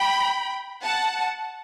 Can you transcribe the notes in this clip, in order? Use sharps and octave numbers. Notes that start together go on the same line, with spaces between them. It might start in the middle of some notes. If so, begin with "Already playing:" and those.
Already playing: G5 B5
F#5 A5